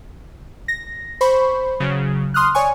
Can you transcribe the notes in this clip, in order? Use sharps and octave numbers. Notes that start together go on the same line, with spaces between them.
A#6
C5 B5 C#6
C#3 F#3
C6 D#6 F6 F#6
C#5 D5 G#5 C#6